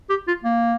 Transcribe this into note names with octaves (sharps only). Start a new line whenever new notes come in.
G4
F4
A#3